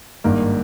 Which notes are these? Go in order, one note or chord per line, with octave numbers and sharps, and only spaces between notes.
G#1 G2 D#3 A#3